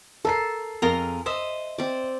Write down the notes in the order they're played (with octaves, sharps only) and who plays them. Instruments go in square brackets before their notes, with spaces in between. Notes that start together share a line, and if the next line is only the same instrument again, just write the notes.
[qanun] A4 [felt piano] A#4 A#5 C7
[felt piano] F2 [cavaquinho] F4 G#4 A#4
[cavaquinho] C5 D#5 E5 [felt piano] E7
[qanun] C4 D5